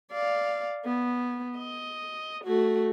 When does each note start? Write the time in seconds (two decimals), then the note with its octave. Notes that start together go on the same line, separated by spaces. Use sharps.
0.11 D5 F5
0.85 B3
1.57 D#5
2.44 A3 F#4